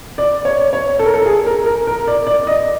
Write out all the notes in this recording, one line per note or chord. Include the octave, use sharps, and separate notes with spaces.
D5
C#5
C#5
A4
A#4
A4
G#4
A#4
A#4
A#4
D5
D5
D#5